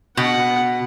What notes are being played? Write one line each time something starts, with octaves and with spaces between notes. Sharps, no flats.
B2 F#5